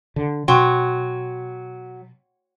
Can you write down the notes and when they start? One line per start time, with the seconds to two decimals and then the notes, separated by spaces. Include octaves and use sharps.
0.16 D3
0.48 B2 F#3 G5 C6 C#6